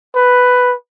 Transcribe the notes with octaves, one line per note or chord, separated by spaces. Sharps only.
B4